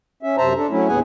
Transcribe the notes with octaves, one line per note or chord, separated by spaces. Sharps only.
C#4 E5
F#2 C3 C5 E5 A5 A#5
D4 A4
F#3 A3 C#4 E4
D#2 A2 B3 G#4 F#5 G#5